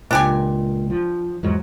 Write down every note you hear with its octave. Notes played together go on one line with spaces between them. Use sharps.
C#2 A#2 D4 G4 G#5
F3
E2 G#2 F#3